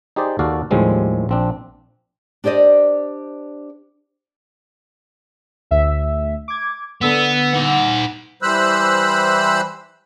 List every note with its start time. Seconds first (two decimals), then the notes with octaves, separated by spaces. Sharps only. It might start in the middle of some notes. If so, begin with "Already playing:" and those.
0.16 D#4 G4 G#4 C5 D5
0.39 D#2 F#4 A4 D5 F5
0.71 D#2 A2 F3 G3 G#3 C4
1.29 A#1 C4 D4
2.44 D4 G4 C5 D5 D#5
5.71 D2 E5
6.48 D6 G#6
7.01 D3 B3 E6 E7
7.53 D#4 F#5
8.42 E3 G3 C5 B5 E6 F#6